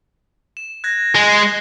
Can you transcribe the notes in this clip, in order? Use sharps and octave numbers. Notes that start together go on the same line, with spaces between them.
E7
F#6 G#6 A#6
G#3 G7